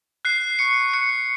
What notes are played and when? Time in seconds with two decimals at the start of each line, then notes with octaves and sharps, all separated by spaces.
0.25 F#6 C7
0.59 C#6 C#7
0.94 F#6 C#7